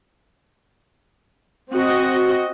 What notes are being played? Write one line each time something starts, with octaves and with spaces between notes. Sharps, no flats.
C4 F#4 D#5